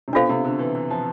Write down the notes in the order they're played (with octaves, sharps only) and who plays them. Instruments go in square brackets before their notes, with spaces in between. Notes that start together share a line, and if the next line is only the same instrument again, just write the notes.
[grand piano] C3
[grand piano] B2 [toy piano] D4 F4 A4 C5 F5
[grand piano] C3
D3
E3
E3
F3